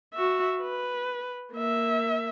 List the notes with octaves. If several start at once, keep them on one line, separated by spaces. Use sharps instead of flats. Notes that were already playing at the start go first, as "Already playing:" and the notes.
F#4 E5
B4
A#3 E5